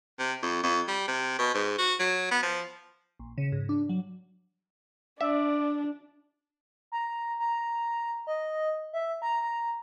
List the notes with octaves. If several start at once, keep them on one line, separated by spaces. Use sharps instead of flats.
C3
F2
F2
G3
C3
B2
G#2
F#4
F#3
B3
F3
A#1
C#3
G#2
D4
F#3
D4 D5 E5
A#5
A#5
D#5
E5
A#5
A#5